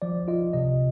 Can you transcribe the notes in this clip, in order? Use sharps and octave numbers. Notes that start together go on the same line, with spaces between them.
F3 D5
F4 D#5
C3 D#5